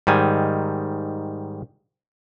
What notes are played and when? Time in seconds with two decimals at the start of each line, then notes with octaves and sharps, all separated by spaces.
0.07 G#2 D#3 G3 G#5